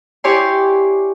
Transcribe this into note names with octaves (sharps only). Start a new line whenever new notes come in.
E4 G4 C#5 D5 G#5 C6